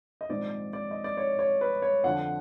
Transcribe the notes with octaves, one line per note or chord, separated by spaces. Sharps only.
D#5
A#1 G#2 D#3 G#3 C4 D5
D5
D#5
D5
C#5
C#5
B4
C#5
F2 D3 F3 F#5